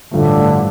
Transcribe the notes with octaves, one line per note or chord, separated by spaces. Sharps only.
A1 G2 D3 F3 A3